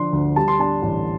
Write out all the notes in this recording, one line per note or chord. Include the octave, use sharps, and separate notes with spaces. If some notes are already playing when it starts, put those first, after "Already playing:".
Already playing: D3 F3 D4 C6
D2
G3 A5
C6
D4 A5
A1